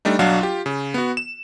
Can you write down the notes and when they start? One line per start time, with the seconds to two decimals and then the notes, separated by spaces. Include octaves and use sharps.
0.05 G3 A3 D4 D#4
0.19 B1 F#3 D4 F5 F#5
0.41 F4 G4
0.66 C#3
0.94 B3 F#4
1.17 E7